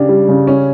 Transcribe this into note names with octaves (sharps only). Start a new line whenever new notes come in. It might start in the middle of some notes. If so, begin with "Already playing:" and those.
Already playing: C#3 D4 G4
G3
C#3
C#4